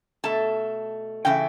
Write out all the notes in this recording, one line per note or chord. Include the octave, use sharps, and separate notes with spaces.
B2 A3 A5
C#3 E3 A3 G5